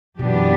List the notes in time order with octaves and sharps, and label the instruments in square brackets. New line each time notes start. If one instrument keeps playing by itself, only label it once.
[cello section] F#2 E3 B3 D4 G4 [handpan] B2